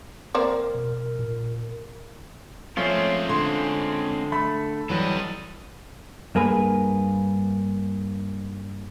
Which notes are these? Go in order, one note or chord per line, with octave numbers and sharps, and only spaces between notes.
A#3 C4 A#4 D5
B2
A#2
F3 G#3 A3 C4 C#4 F4 C#5
D3 C6
A3 B5
E3 F#3 G3 A4 D#5
G2 A#3 G#4 B4